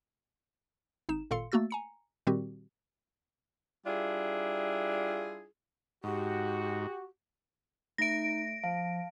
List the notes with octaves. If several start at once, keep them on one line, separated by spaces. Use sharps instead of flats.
G#1 D#4 E7
G#1 A#2 A4 F5 C6 C#7
A3 A#3 F#4 E6 A6
G#5 A#5 C#7
A#2 D#3 G3 C4 F#4 G4
G3 D4 E4 F4 G#4
G#2 F#4 G4
A3 D#4 E5 A#6 D7
F3 F5 A5